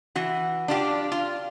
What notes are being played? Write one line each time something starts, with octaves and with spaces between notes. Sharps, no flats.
E3 F#4
D4 F4 G4
F4